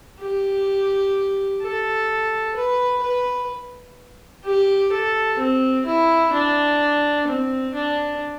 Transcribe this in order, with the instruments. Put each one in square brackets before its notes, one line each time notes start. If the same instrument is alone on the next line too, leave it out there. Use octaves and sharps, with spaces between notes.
[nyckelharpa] G4
A4
B4
B4
G4
A4
C4
E4
D4
C4
D4